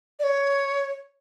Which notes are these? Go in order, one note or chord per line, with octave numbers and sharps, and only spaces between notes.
D5
C#5